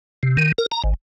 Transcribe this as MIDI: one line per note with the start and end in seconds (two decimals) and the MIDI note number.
0.23 0.37 48
0.37 0.52 51
0.58 0.66 70
0.71 0.82 82
0.84 0.94 32